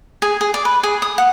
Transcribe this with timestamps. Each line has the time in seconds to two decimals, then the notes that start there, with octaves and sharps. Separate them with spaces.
0.22 G#4
0.41 G#4
0.54 D5
0.65 B4
0.83 G#4
1.02 D#6
1.18 F#5